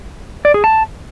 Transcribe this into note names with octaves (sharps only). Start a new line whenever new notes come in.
D5
G#4
A5